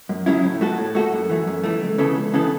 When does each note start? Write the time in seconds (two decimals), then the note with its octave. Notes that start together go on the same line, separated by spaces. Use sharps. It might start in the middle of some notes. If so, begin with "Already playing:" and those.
0.09 F#2
0.26 C#3 F#3 C#4 E4
0.44 A2
0.61 A3 F#4 A4
0.78 A2
0.95 A3 F#4 A4
1.13 F#2
1.29 E3 A3
1.47 F#2
1.64 E3 A3
1.81 C#2
1.98 C#3 E3 B3 A4
2.16 C#2
2.33 C#3 E3 B3 A4